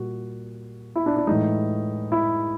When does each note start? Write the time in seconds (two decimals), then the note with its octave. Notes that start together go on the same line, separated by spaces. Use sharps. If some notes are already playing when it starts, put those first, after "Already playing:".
Already playing: A#2 G3 F#4
0.96 E4
1.06 D4
1.17 D4
1.27 A2 E3 G#3 D#4
2.12 E4